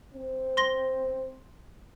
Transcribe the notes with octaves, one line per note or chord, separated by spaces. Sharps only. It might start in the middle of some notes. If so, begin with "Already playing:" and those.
C4
C6 A#6 G7